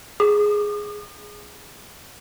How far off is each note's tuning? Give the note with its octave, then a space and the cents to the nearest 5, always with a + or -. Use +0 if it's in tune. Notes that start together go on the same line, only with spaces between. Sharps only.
G#4 +0 D#6 -40